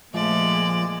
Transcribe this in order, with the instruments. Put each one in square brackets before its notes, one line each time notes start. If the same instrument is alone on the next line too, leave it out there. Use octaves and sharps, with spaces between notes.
[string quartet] A#2 G#3 [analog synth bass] F3 [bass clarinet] A3 [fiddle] D5